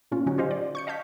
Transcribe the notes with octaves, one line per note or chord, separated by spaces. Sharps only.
A#2 A#3 C#4 F4
D3 F#3 C#4 D#4 F#4
F4 G4 C5 D#5 F5
D5
C#6 G6 C#7
D#5 F5 A5 G6 B6